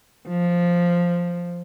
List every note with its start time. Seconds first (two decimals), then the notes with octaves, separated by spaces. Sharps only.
0.28 F3